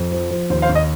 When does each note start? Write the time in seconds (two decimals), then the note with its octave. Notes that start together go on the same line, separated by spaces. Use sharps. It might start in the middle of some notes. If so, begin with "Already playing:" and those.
Already playing: F2
0.12 F3
0.31 F3
0.50 D#2 C5
0.62 C5 F5
0.69 D#2
0.75 D#5